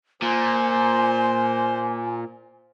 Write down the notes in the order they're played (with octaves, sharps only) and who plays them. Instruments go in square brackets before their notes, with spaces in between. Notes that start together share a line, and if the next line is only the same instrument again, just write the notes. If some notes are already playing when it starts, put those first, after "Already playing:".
[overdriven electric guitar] A#2 [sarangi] C5 [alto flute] G#5